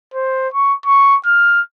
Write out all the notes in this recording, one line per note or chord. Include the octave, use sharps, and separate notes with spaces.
C5
C#6
C#6
F6